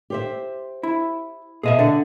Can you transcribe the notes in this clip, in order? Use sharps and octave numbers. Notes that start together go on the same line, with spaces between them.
G4 C5 E5
E4
B2 G#4 D#5 E5
D3 D5 F#5